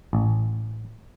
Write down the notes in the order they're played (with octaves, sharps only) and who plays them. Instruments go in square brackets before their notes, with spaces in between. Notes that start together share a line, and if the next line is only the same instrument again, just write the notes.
[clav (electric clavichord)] A1